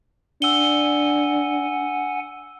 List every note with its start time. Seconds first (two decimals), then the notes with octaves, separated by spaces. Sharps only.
0.42 D4 F#5 G#5 E6 G7